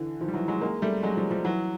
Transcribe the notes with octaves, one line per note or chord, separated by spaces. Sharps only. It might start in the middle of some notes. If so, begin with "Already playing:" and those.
Already playing: D3 E3
D#3 F3
G3
E3 F#3
F#3 G#3
G#3 A#3
G3 A3
F#3 G#3
F3 G3
F3 G3
E3 F#3